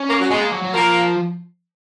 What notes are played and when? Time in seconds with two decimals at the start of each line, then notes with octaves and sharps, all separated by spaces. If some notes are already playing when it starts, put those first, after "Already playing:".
Already playing: C#4
0.09 A#3
0.20 F#3
0.30 G#3 B3
0.41 A#3
0.52 F#3
0.63 F#3
0.74 F3 A#3